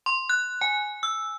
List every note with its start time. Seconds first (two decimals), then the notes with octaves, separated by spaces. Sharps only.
0.06 C6
0.29 F#6
0.61 G#5
1.03 E6